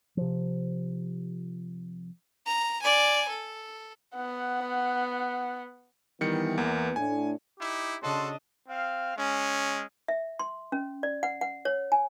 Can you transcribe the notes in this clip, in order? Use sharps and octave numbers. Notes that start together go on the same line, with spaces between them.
C3 F3
A#5
D5 G#5
A4
B3 F#5
D#3 E3 G3 B3 C#7
E2 A#3
A2 D4 G#5
D#4 E4 G4
C#3 D4 F#4 A4 D#5 C6
C4 F5
G#3 C#4
E5
C6
C#4
D5
F#5
F#5
C#5
G#5